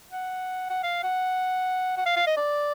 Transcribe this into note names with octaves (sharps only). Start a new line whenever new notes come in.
F#5
F#5
F5
F#5
F#5
F5
F5
D#5
D5